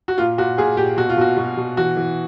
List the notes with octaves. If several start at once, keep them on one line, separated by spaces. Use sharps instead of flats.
F#4
A#2 F4
A#2 F#4
A#2 G#4
A#2 G4
B2 F#4
F4
B2 F#4
B2
B2
E3 F#4
E3